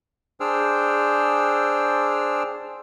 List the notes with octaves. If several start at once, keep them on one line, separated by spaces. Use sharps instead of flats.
D4 G#4 C5 G5 E6 F6